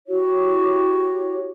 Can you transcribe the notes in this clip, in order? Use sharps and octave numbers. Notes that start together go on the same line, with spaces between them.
E4 F#4 G4 C#5